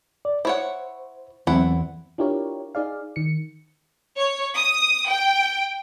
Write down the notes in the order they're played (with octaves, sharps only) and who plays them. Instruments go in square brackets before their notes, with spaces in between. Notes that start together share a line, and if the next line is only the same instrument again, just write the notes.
[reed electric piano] D5
[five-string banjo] E4 C#5 F#5 [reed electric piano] C5
[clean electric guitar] E2 [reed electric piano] F#3 C4 [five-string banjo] A3 E4 F#5
[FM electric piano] D4 E4 F4 G4 A#4 C#5
D#4 G#4 D5 F5
D#3 C#7
[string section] C#5
D#6
G5